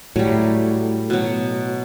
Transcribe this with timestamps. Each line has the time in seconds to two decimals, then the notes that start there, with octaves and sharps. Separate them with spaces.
0.16 A2 F#3 G3
1.10 B2 F#3